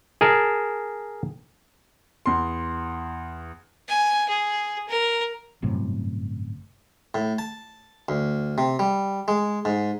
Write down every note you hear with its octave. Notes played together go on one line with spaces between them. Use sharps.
G#4 A#4 A5
E2 C6
G#5
G#4
A#4
G1 F#2 A2 C3
A2
A5
D2
C3
G3
G#3
G#2